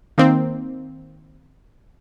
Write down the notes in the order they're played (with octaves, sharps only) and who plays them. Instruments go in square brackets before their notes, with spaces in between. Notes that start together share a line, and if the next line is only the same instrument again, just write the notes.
[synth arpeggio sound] D#3 A#3 C4